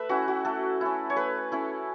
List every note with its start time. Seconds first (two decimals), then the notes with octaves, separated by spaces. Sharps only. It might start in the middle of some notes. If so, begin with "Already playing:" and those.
Already playing: A3 B4 E5
0.09 C#4 E4 F#4
0.28 F#4
0.45 A3 A4
0.81 C#4 E4
1.10 C#5
1.16 A3 B4
1.52 C#4 E4